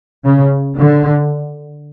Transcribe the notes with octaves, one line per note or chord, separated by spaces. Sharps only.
C#3
D3